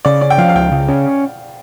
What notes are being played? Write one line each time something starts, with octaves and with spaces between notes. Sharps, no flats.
C#3 D5
C#4 D5
G5
F3 F5
F5
C#2 G5
C#3
C#4